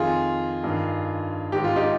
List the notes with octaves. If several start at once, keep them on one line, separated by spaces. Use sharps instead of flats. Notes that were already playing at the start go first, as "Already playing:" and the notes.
Already playing: F2 D#3 F4 G#4
G2 D#3
G#2 D#3 G4
F4
D#4 G4